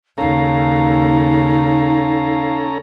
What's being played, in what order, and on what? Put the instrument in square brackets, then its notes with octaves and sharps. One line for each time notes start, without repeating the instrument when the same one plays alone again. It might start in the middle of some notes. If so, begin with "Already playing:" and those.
[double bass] D#2 C#3 [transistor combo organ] C#4 A4 A#5 [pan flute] D#4 [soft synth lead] F5